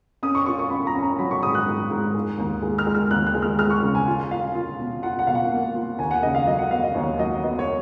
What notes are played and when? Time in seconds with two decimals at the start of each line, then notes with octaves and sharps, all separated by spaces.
0.23 C#4 D#6
0.35 C#6
0.46 F4 C#6
0.59 C#6
0.70 C#4 B5
0.87 A#5
0.95 C#4
1.02 A#5
1.18 F#3 B5
1.31 C#6
1.43 G#2 D#6
1.55 F#6
1.67 G#2
1.90 G#2
2.15 G#3
2.38 D#2
2.62 G#3
2.78 F6
2.87 G#3
2.94 F6
3.11 D#2 F#6
3.27 F#6
3.34 G#3
3.42 F6
3.59 G#3 F6
3.70 C#6
3.82 C#3
3.95 G#5
4.07 F4
4.31 F4 F5
4.55 F4
4.79 B2
5.03 F4 F#5
5.19 F#5
5.27 B2 F5
5.35 F#5
5.51 A#3
5.75 F4
5.99 D#2 G#5
6.11 F#5
6.23 C#3 D#5
6.35 F5
6.47 F#3 D#5
6.59 F#5
6.71 B3 F5
6.83 D#5
6.95 D#2 C#5
7.19 F#3 D#5
7.43 B3 D#5
7.59 C#5